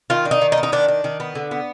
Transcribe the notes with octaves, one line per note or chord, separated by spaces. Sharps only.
D#3 F4
D4
D#4
D#3
D#4
B3
D#4
D#3 D4
D4
D#3
B3
D3
B3